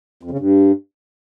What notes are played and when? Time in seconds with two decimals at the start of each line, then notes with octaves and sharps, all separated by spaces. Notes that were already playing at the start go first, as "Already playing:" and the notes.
0.23 F2
0.31 C#3
0.39 G2